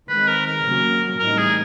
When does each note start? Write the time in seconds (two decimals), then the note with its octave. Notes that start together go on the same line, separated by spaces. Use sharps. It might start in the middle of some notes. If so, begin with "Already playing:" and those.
0.09 D#3 G#3 C4 B4
0.28 A#4
0.46 A#4
0.64 C#3 F#3 A#3 C#4 F#4
1.19 A2 E3 G3 C4 D#4 A#4
1.38 G#4